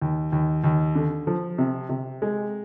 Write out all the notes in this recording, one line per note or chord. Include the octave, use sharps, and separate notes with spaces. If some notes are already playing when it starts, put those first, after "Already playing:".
D#2
D#2
D#2
D3
F3
C3
C3
G#3